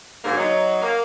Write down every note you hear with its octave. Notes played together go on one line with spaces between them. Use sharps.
G#2 D3 F#3 A#3
F#3 D#4
A#3